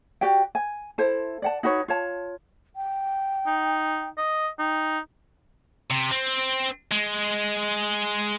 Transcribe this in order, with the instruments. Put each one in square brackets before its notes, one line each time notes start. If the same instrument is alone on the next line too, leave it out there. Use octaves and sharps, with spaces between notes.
[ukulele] F#4 G4 D5 G5
G#5
E4 A4 C5
D5 F#5 A5
D#4 F#4 B4 C#5
F4 C#5 A5
[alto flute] G5
[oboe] D#4
D#5
[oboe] D#4 [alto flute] G5
[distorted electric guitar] C3
C4
G#3